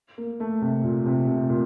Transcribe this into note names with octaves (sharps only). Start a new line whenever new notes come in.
A#3
A3
C3
A#2
C3
C3
A#2